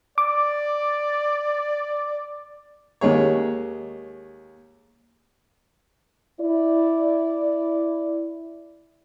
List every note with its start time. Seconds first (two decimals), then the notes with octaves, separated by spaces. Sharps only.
0.18 D5 D6
3.01 D#2 G#3 G#4 C#5
6.40 E4 D5